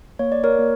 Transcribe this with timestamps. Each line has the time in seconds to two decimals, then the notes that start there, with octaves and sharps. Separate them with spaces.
0.19 A#3 C#5
0.32 D5
0.44 A#4 C#5
0.59 A#3